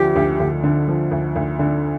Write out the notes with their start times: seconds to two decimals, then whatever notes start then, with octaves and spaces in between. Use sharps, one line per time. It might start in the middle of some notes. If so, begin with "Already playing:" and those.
Already playing: D2 D3 F3 G4
0.16 D2
0.40 D2
0.63 D3
0.88 F3
1.11 D2
1.36 D2
1.59 D3